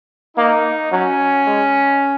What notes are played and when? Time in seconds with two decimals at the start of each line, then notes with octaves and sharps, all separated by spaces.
0.37 A#3 D#4
0.92 F#3 C#4
1.47 G#3